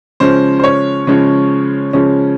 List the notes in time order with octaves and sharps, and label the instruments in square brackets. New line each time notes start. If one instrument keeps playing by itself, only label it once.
[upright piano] C#3 F3 G#3 C#4 C5
C5
C#5
C#3 F3 G#3 C#4
C#3 F3 G#3 C#4